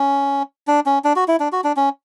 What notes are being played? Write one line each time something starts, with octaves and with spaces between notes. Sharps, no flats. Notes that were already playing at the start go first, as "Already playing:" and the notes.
Already playing: C#4
D4
C#4
D4
F#4
E4
D4
F#4
D4
C#4